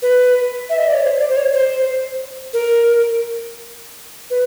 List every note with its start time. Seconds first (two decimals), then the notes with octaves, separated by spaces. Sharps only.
0.02 B4
0.70 E5
0.78 D#5
0.87 D5
0.95 C#5
1.03 C5
1.20 D5
1.29 C5
1.36 C#5
1.53 C5
2.53 A#4
4.30 B4